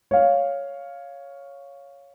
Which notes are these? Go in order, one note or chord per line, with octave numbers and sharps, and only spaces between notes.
C#5 F5